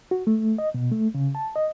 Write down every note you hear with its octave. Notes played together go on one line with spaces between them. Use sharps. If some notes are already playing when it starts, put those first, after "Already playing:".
F#4
A3
D#5
B2
A3
C#3
A5
D#5